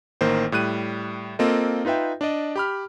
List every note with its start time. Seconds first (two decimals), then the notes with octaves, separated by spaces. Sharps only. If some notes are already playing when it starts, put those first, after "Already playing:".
0.21 A1 D#3 A#3 C5
0.52 A2 G3 F#6 D#7
1.39 A#3 C4 F4 A4 D#5
1.85 D#4 F4 B4 E5 G5
2.21 D4 D5 D#5
2.56 G4 B5 F6